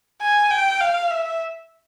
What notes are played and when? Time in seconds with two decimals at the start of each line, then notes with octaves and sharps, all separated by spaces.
0.22 G#5
0.50 G5
0.81 F5
1.11 E5